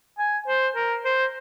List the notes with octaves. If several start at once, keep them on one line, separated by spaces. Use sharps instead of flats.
G#5
C5
A#4
C5